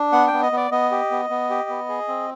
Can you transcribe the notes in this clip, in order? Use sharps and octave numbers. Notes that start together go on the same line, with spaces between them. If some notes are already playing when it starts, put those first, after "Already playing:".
Already playing: D4
B3 F#5
G5
B3
D#5
B3 D5
B3 D#5
G4
B3
B3
G4
B3
G#4
C4